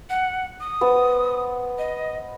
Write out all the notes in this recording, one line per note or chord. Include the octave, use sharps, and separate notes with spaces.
F#5
D#6
B3 C5 A5
D#5